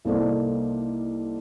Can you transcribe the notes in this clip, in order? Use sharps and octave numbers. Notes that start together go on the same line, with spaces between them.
C2 A#3 D#4 A4 C5 D5